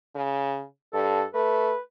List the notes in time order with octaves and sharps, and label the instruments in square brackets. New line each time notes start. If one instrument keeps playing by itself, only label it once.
[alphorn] C#3
[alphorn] G2 [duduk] A4
[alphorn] A3 [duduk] B4